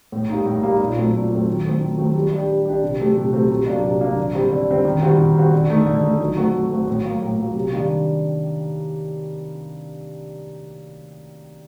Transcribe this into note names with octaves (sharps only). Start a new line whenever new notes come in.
A2
G3 A#3 D#4
A2
G3 A#3 D#4
A#2
F#3 A3 C4
A#2
F#3 A3 C4
D#3
F#3 A3 C4
D#3
F#3 A3 C4
G3
D4 G4
G3
D4 G4
C3
F#3 A3 C4 G4
C3
F#3 A3 C4 G4
C3
F#3 A#3 D4
C3
F#3 A#3 D4
D3
G3 C4
D3
G3 C4
D#3
G3 C4 F#4
D#3
G3 C4 F#4
D3
A3 D#4
D3
A3 D#4
F#3
A3 C4 F#4
F#3
A3 C4 F#4
A2
F#3 A#3
A2
F#3 A#3
C3
D#3 G3 A#3 D4